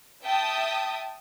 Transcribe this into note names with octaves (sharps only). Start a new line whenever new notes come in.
E5 G5 A5 D#6